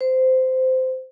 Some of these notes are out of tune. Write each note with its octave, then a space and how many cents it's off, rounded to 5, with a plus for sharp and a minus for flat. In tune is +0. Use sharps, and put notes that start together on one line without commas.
C5 -15